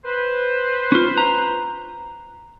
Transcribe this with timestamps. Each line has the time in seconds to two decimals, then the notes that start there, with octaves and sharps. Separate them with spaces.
0.05 B4 C5
0.92 C#4 F4
1.18 A#5